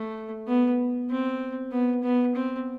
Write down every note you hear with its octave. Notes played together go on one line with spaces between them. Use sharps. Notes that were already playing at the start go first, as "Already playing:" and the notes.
Already playing: A3
B3
C4
B3
B3
C4